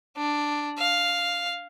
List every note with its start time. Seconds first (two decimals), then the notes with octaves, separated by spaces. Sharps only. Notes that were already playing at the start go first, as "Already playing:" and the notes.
0.16 D4
0.78 F5